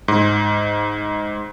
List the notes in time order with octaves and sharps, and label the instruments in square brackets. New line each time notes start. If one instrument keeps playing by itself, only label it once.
[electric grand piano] G#2